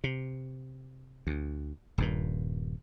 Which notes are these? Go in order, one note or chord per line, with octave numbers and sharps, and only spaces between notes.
C3
D2
D#1 G2 A#2